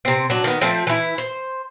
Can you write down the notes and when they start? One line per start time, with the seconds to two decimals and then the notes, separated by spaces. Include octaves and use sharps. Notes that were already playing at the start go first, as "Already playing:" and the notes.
0.05 C3 C4
0.30 F#3 D4
0.44 D#3 B3
0.61 F3 A3 C4
0.87 E3 E4
1.18 C5